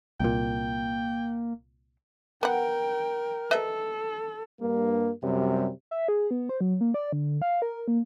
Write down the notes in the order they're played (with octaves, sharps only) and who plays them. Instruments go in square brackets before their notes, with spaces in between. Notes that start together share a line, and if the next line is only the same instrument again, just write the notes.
[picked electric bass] C2 A#2 [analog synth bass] A#3 [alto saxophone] G5
[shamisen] B3 F#5 [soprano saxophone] A#4 [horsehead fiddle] G5
[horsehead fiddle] A4 [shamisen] B4 D#5 E5
[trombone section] G2 A#3
F#2 C3 G3
[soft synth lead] E5
G#4
B3
C5
F#3
A#3
D5
D3
F5
A#4
A#3